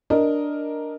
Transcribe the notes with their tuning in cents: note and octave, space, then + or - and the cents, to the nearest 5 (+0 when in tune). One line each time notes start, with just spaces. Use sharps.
D4 +0 A#4 +0 D#5 +0